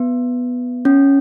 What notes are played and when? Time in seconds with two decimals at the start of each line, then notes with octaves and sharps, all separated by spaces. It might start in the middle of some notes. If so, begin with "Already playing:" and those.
Already playing: B3
0.85 C#4